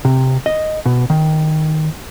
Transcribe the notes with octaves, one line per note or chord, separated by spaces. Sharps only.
C3
D#5
B2
D#3